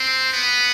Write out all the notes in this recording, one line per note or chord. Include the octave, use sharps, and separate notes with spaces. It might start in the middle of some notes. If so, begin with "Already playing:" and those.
Already playing: C4
B3